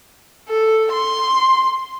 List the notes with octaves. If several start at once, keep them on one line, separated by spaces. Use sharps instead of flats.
A4
C6